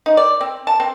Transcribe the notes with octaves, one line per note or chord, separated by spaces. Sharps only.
D#4
D5
C4
A5
C4